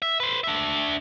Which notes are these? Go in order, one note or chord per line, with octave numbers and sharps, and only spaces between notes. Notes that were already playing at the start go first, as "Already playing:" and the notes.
E5
B4 C5
D4 E5